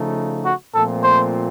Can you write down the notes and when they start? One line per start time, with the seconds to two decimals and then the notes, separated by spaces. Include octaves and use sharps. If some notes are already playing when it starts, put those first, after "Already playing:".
Already playing: C#3 F3 A3 D#4
0.45 F#4
0.74 A#2 F3 A3 C4 A4
1.04 C5